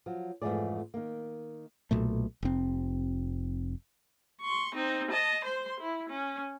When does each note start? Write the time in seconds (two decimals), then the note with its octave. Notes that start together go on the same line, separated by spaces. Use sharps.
0.06 F3 F#3
0.42 F2 G#2 E3 A3 G#4 D5
0.94 D#3 A#3
1.91 B1 A#2 A3
2.43 F1 C4
4.42 C6 C#6
4.75 C4 D#4
5.11 D#5 A5
5.44 C5 C6
5.80 E4
6.09 C#4